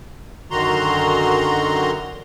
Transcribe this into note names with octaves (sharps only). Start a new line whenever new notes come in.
F#2 D3 D#3 F#4 A#5 C6